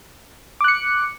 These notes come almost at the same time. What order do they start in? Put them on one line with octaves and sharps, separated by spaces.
D6 F#6 C#7